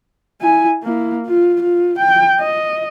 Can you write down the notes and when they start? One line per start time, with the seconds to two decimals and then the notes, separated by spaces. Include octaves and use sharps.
0.41 E4 G#5
0.83 A#3 E4
1.26 F4
1.62 F4
1.98 G5
2.40 D#5